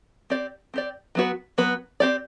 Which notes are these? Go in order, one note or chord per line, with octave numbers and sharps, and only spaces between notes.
C4 G4 D5
C4 G4 D5
F#3 B3 F#4 B4
F#3 B3 F#4 B4
C4 G4 D5